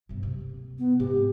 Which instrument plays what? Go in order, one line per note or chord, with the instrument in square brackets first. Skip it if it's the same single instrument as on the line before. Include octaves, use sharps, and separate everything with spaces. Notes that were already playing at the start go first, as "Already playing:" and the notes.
[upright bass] G1 C3
C3 A#3
[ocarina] B3
[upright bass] G#2 [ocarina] G4